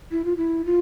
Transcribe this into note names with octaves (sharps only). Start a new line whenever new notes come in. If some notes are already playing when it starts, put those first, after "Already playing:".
E4
F4
E4
F4